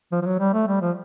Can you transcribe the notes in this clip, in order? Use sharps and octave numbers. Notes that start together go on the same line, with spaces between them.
F3
F3
F#3
G3
A3
G3
F3